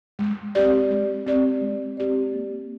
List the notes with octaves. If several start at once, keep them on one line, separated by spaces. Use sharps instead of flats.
G#3
C4 G4 D5
G#3
C4 G4 D5
G#3
C4 G4 D5
A#3